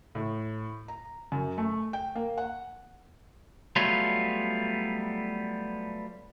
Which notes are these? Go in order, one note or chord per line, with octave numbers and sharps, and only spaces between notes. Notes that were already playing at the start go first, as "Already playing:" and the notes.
A2
A#5
F#2
A3
G5
A#3
F#5
F#3 G3 A3 B3 F4 C#5